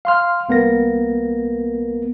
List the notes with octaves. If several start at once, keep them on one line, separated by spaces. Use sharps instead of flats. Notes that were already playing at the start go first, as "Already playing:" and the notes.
F5 C6 F6
C2 A#3 B3 A#4 A#6